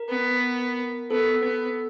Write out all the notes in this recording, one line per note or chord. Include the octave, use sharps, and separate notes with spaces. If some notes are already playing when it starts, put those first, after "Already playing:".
Already playing: A#4
B3
B3 A4
B3